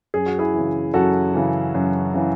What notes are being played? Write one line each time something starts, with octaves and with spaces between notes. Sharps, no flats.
F#2 G#4
F#4
E4 G#4
C#3 E3
F#2 F#4 A4
C#3 E3
F#2
C#3 E3